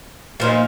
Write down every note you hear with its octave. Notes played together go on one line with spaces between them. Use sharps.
A#2 F3 A#3 D#4